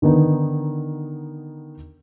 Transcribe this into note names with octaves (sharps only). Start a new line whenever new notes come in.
D3 D#3 B3 D#4